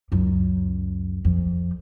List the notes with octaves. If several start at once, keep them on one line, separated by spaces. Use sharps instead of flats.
C#2 F#2
F2